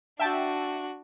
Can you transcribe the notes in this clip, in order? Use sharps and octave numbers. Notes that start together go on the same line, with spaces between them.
D4 F#4 E5 G5 A5